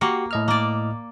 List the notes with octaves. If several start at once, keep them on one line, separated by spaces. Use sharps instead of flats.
A#3 F#4 G4 C#6
A2 D#5 F6
A#3 D5